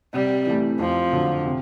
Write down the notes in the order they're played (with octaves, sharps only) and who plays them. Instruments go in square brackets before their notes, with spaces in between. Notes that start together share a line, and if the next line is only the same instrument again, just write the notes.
[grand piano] C3 [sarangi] G3
[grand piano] E3 A3
[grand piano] F2 [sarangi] F3
[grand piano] D3 F#3
C3